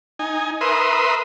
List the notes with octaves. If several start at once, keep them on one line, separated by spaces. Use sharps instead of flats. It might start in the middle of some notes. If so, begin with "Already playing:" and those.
D#4 G#5
A#4 B4 E5 C6 D#6